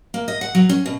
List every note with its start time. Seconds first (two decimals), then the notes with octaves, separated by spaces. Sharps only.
0.14 A#3
0.28 D#5
0.41 F#5
0.55 F#3
0.69 C#4
0.86 B2